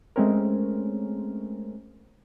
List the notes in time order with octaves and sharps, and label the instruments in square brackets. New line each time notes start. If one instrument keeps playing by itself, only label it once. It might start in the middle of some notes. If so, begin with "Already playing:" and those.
[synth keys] G#3 A3 C4 C#4 A#4